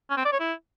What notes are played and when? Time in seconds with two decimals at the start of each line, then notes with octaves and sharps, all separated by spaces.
0.10 C#4
0.18 C4
0.25 D5
0.33 C#5
0.40 E4